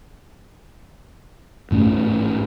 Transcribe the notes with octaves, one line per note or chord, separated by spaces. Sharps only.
A1 G#2 A3 C#4